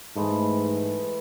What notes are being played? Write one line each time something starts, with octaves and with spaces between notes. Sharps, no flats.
G#2 E3 G#3 A3